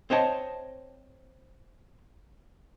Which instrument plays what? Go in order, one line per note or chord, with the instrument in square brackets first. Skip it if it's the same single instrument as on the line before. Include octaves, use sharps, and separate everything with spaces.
[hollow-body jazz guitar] C4 C5 C#5 D#5 A5